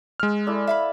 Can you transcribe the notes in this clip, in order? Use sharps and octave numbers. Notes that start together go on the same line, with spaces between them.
G#3 F6
E4 A4 D5
E5 F5 B5